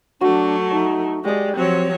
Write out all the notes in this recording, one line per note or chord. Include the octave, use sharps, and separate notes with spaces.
F#3 A3 D4 F#4
D#4 E5
G#3 G4 D5 D#6
F3 F#3 C4 C#5